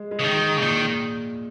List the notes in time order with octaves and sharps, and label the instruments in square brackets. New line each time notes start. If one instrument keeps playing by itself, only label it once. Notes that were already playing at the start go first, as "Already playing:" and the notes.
Already playing: [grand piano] G#3
G#3
[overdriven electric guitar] C#3
D#3
[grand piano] G#3
[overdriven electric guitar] C#3
[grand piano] A#2 [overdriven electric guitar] D#3